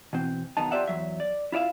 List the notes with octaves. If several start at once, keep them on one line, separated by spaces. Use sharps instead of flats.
B2 E3 C4
B1 B2 D#3 D#4 A5
F4 G4 G#4 D5 E5 F#5
E2 F#3 E5
D5
E4 F4 D5 E5 F5